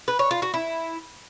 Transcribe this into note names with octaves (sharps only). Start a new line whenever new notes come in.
B4
C#5
F4
F#4
E4